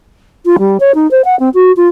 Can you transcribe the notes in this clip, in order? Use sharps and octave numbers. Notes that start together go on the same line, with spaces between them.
F4
G3
C#5
D#4
C5
F#5
C4
F#4
F4